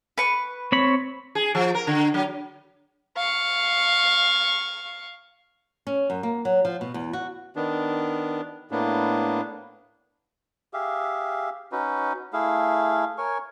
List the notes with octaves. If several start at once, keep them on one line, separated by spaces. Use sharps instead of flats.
B4 C#6
C4 C#5 B5
G#4
F3
A#4
D3
F#3
F5 C#6
C#4
F#2
A#3
F#3
F3
B2
E2
F#4
D#3 B3 D4
A2 A#3 B3 D4
G4 G#4 E5 F5
C#4 D#4 F#4 B4
A3 E4 G#4 F5
A#4 C#5 G#5 C#6